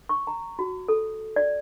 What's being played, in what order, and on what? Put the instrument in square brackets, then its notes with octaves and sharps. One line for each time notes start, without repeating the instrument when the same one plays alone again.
[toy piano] C#6
A#5
F#4
A4
D5